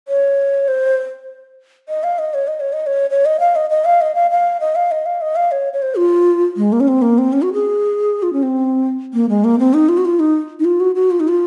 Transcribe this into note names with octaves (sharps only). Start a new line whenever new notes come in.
C#5
C5
D#5
F5
D#5
C#5
D#5
C#5
D#5
C#5
C#5
D#5
F5
D#5
D#5
F5
D#5
F5
F5
D#5
F5
D#5
F5
D#5
F5
C#5
C#5
C5
F4
G#3
A#3
C#4
C4
A#3
C4
C#4
F#4
G#4
F4
C#4
C4
A#3
G#3
A#3
C4
D#4
F4
F#4
F4
D#4
D#4
F4
F#4
F#4
F4
D#4
F4